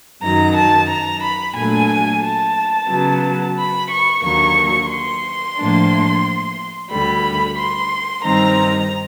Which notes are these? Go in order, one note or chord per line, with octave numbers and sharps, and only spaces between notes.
F#2 D#3 F#3 A#5
A5
A#5
B5
A#2 F#3 A3 D4 G#5
A5
C#3 F#3 B3
B5
C#6
D#2 D3 F#3 A#3 C#6
C6
A2 F3 A#3 D4
D2 D3 G3 B5
C6
G2 D#3 G3 C4 D#4 A#5